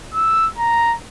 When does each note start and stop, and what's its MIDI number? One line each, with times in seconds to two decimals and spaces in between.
0.14 0.48 88
0.58 0.95 82